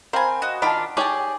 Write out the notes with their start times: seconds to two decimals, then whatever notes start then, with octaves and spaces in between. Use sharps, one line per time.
0.13 C4 A#4 C5 F5 G5 G#5 B5
0.42 F#4 D#5
0.62 D#3 D4 F4 F#5 A5 B5 F6
0.97 D#4 G4 G#4 C#5 D5 G5